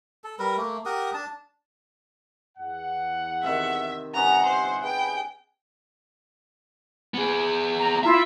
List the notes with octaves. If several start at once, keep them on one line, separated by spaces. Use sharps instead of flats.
A4
G3 A#4 B4
A3 A#3
G4 A#4 F#5 D#6
D4 A5
E2 F#5
C3 D#3 E5
G1 C3 B3 C#4 E5 F#5 A#5
C5
G#4 B4 G5
B3 G#4
A#5
E4 F4 E5